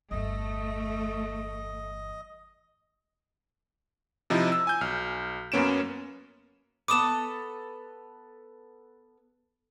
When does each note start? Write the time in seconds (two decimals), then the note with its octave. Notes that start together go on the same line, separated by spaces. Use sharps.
0.11 G1 E2 A3 D#5
4.30 C3 F3 D#4 E4
4.52 E6
4.67 G#5 G6
4.81 B1 F6
5.52 F#2 A#3 B3 C#4 D7 E7
6.88 B3 A4 B4 D6 D#6 E7